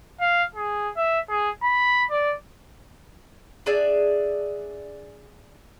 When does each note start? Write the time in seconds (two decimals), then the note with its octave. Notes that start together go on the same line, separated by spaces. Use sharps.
0.21 F5
0.55 G#4
0.96 E5
1.29 G#4
1.63 B5
2.11 D5
3.66 D4 G#4 D5 E5